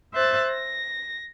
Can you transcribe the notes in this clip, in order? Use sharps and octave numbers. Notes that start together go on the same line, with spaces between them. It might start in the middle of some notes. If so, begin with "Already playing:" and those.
C5 E5 F#6 A6
A#6